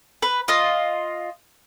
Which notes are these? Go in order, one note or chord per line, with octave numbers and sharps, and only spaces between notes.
B4
F4 D#5